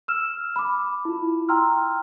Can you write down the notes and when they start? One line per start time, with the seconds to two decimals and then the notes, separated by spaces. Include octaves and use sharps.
0.08 E6 F6 E7
0.56 B5 D6
1.05 E4 F4
1.49 G5 A#5 C6 E6 F6